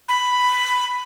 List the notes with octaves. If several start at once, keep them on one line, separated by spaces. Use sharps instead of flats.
B5